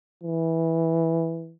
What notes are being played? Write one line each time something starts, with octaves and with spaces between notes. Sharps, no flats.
E3